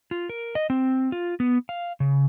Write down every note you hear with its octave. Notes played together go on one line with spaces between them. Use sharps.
F4
A#4
D#5
C4
F4
B3
F5
C#3